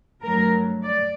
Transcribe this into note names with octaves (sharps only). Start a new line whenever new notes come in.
G2 F#3 A3 A#4
D5